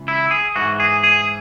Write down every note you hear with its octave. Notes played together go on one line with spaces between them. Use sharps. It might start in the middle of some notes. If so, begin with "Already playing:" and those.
Already playing: C#2 E3
E4
G#4
G#2 E3 F#4
G#4
G#4